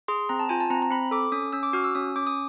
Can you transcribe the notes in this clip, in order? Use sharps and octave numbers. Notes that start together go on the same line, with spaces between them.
G#4 C6
C4 A#5
A5
F4 G#5
A5
C4 A#5
A#5
C4 B5
A4 D6
C#4 D#6
C#4 E6
D6
F#4 F6
E6
C#4 D#6
C#4 D6
D#6